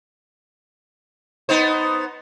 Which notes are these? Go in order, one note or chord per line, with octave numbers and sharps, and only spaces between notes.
B3 D#4 C5